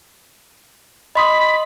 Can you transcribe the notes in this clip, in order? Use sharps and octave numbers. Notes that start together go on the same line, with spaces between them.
D#5 B5 C6 D#6